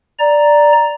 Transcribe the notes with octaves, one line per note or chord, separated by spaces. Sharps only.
D5 A#5